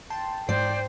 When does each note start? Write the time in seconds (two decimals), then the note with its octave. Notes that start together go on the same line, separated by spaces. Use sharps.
0.10 G5 A5 C6
0.49 G#2 C5 D5 G5